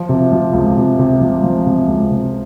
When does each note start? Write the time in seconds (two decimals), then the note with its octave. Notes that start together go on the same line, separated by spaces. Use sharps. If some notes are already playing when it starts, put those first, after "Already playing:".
Already playing: F3
0.09 C3
0.32 F3
0.54 C#2
0.76 C3
0.99 C3
1.21 F3
1.43 F3
1.66 C3
1.88 C#2
2.11 C3